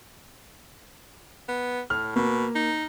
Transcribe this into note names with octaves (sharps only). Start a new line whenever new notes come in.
B3
A2 F6
B2 A#3
D#4